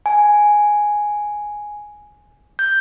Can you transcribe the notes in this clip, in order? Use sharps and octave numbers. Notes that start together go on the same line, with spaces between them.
G#5
G6